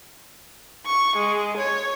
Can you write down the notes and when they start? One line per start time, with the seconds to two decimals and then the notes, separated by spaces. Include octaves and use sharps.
0.86 C#6
1.16 G#3
1.57 C#5